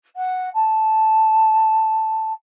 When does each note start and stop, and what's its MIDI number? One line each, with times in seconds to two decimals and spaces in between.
0.16 0.49 78
0.54 2.33 81